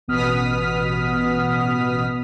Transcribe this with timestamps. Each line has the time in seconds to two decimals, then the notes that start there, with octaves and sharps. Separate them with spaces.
0.08 A1 B2 B3 D#6 F6 B6